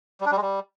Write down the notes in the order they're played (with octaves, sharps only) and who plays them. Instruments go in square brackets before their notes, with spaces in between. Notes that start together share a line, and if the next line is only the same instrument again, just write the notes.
[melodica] G3
D4
G3
G#3
G3